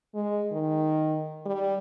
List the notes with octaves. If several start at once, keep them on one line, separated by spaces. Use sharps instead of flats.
G#3
D#3
G3